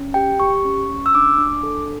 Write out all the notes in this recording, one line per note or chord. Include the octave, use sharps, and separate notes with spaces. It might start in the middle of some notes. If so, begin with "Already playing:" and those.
Already playing: C#4
G4 G5
G4 C#6
C#4
C#4
E6
D4 D6
D4
A4